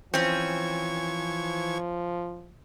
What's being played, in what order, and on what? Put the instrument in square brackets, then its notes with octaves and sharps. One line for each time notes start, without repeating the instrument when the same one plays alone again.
[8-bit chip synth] E3 C#6 G#6 [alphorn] F3 [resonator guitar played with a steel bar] C4 C#4